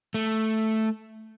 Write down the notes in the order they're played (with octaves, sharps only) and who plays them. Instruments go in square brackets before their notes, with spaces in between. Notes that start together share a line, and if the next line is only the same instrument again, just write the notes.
[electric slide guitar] A3